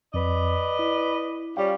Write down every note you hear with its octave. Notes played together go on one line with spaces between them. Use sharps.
F2 B4 D5 D#5
E4
G3 C#4 F4 F5 G5